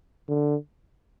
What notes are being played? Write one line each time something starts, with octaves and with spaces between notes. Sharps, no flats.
D3